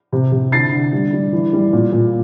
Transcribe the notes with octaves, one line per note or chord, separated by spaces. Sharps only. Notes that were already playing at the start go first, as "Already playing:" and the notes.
C3
C3
D3 A6 C7
D3
G3
G3
E3
G3
A#2
A#2